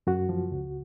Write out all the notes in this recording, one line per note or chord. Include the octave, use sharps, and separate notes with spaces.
F#2 F#4
F3
C#2